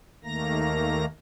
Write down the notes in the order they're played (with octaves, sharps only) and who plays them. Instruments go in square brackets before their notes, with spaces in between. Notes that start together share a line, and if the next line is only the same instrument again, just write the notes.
[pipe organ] D#2 D#3 A3 A#3 A#5 A#6